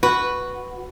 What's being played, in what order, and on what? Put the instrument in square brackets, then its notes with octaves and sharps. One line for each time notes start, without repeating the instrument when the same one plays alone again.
[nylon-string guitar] F#4 [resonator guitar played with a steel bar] B4